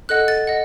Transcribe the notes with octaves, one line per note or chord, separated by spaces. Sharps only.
A4 D#5 F#5 F#6
A6
D#5 F#5